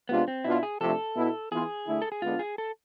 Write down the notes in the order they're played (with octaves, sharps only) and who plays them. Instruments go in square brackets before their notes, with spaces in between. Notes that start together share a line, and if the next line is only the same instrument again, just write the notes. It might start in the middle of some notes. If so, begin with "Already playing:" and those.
[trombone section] C3 G#3 D4 F4 [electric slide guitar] B3
[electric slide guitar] C4
[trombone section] B2 B3 D4 F4 [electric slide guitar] E4
[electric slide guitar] G#4
[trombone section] C3 F3 A3 D4 [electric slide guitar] A4
[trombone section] B2 B3 E4
[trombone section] E3 B3 F4 [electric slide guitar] G#4
[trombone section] D3 A3 E4
[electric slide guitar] A4
G#4
[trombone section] D3 G#3 B3 D4 [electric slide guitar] F4
[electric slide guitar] G#4
A4